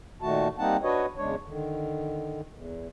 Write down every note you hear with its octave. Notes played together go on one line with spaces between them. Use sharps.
A#2 D#3 A3 F#4 A5
G3 A#3 C4 D#4 F#5 A5
D4 F#4 B4 C#5 D#5
E2 C#3 G#3 D4 C#5
D3 D#3
E2